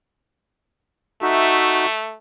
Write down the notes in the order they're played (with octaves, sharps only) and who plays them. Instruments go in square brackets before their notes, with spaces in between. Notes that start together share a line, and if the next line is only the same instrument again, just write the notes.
[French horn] A3 [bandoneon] D#4 F#4 E5